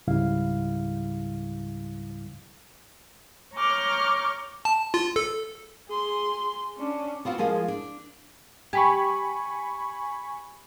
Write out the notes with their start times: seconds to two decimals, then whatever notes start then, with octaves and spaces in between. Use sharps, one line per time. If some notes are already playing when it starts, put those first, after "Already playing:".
0.07 C#2 G#2 C#3 G3 E4 F5
3.55 C#5 A#5 C#6 D6 F6 G6
4.65 A5
4.94 F4
5.16 A4
5.88 G#4 C6
6.77 C#4 D4
7.25 B3 C4 F4 F#4
7.38 F3 G#3 A#3 F4 G#4
7.68 D4
8.73 G4 G#5 B5 C#6